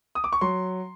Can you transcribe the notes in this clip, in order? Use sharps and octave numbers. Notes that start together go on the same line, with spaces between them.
D#6
D6
C#6
F#3 C6